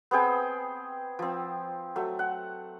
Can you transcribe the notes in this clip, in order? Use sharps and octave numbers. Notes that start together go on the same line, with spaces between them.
B3 C4 G#4 G5
F3 C4
F#3 A3
F#5